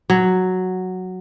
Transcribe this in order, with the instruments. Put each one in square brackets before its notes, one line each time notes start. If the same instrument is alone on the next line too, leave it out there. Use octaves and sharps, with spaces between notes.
[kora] F#3